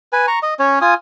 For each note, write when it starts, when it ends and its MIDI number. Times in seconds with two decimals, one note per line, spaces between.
0.13 0.26 71
0.13 0.26 80
0.28 0.39 82
0.28 0.39 85
0.43 0.54 75
0.59 0.79 61
0.59 0.79 73
0.81 0.94 65
0.81 0.94 80
0.81 0.94 87